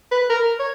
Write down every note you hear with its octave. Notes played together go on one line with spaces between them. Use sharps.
B4
A#4
C#5